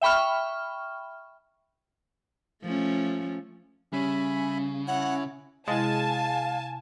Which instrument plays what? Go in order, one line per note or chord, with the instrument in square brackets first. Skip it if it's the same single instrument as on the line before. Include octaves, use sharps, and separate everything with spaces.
[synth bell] E5 G5 B5 C#6 F6
[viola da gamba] F3 A3 C#4
[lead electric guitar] C#3 [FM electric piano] G3 C#4 [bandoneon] E5 G#5 B5
[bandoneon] E4 C#5 [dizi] F#5
[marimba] C3 E4 [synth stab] G#3 [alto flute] F5 [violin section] G#5 A5